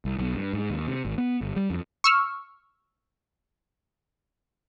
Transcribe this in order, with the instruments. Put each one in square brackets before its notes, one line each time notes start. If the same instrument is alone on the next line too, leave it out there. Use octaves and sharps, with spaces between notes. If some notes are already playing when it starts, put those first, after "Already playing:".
[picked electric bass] C2
B1
G2
G#2
D#2
C3
G#1
B3
G1
G3
F2
[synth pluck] C#6 E6 F6